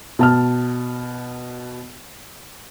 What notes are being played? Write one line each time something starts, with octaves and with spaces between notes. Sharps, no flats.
B2 A5 F6